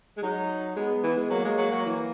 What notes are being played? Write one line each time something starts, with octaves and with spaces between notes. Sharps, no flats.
G#3
F#3 D#4
G#3 B3
E3
G#3
F#3 A#3
G#3
F#3
F#3
E3